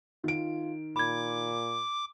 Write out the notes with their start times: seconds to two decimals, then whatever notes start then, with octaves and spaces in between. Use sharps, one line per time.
0.24 D#3 F4 D7
0.96 A#2 B5 D6 G#6